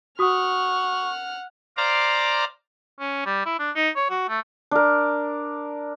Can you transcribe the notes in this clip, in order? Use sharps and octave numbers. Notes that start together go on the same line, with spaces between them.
F#4 F#5 C#6 D#6 F6
C5 D5 F5 A#5 D6
C#4
G3
E4
D4
D#4
C#5
F#4
A3
D4 A#4